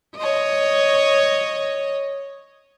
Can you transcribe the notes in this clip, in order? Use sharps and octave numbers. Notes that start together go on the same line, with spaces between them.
C#5 D#5